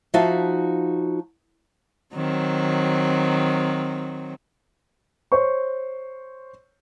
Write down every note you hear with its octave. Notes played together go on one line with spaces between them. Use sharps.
F3 D#4 F#4 E5 F5 A5
D#3 F#3 C4
C5 C#5 C#6